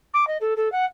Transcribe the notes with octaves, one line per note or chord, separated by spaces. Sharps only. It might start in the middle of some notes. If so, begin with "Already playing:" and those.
D6
D#5
A4
A4
F#5